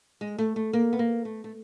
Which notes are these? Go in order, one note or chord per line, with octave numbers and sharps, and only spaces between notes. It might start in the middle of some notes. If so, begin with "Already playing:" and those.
G#3
A3
A3
A#3
B3
A#3
A3
A3